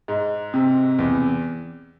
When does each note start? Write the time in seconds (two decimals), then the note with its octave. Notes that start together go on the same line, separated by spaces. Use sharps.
0.08 G#2
0.54 C3
0.99 E2